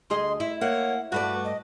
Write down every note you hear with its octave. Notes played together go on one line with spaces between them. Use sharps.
D2 G#4 D#5 C6
E4 E5
A#3 C#5 F#5
G2 A3 F#4 B4 D5
D#5